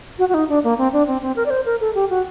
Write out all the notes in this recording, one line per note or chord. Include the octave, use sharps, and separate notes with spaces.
F#4
F#4
D#4
D4
A#3
C4
D4
C4
C4
A#4
D5
C5
A#4
A4
G4
F#4